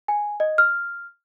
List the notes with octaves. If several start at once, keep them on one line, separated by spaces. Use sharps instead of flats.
G#5
D#5
F6